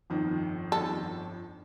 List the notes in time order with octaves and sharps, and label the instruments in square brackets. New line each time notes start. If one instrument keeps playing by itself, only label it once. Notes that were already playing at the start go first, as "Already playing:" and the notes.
[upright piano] G1 F2 D#3
[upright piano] G1 F2 D#3 [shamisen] A4